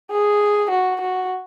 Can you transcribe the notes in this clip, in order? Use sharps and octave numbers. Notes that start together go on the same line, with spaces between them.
G#4
F#4
F#4